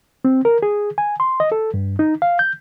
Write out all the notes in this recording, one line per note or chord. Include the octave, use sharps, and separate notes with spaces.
C4
A#4
G#4
G#5
C6
D#5
A4
G2
D#4
F5
G6